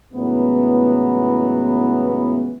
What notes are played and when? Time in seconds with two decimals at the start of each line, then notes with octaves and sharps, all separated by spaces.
0.14 C#2 A2 E3 F#3 B3